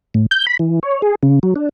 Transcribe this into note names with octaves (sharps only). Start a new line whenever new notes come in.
A2
G6
B5
E3
C#5
G#4
C#3
F#3
D4